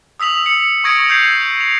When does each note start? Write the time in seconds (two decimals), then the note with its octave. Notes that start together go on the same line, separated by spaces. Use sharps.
0.20 D#6 E6 B6 F7 F#7
0.44 E6 C#7
0.84 C#6 D#6 G#6 A#6 C#7 D7
1.09 E6 G6 G#6 C7 F7
1.60 F7